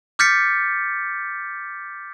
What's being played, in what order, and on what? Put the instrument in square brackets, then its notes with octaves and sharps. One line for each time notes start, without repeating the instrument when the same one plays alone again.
[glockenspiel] D6 F6 G6 A6 B6 C#7